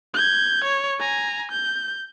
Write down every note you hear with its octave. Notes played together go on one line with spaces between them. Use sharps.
G6 G#6
C#5
G#5 A#5
G6